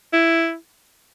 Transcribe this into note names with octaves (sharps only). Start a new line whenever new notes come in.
E4